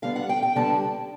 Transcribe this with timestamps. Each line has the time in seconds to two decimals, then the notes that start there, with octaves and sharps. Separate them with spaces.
0.02 D3 G3 B3 F5
0.16 F#5
0.29 G5
0.43 G5
0.56 D3 G3 B3 A5